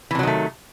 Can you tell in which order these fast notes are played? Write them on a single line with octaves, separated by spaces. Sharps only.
E3 C3 F#3 D#3 A3